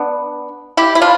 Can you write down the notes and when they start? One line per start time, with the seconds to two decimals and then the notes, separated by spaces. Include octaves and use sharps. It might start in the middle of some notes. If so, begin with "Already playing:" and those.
Already playing: B3 D4
0.77 E4 G4
0.95 E4
1.01 D4 F4